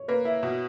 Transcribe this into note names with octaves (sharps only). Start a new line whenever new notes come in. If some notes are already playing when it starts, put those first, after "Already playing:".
Already playing: C#5
A#3 B4
E4
B2